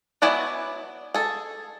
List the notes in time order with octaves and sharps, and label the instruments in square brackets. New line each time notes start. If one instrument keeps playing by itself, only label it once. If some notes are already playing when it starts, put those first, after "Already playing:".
[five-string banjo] F#3 B3 E4 D5 G#5
G#4 A4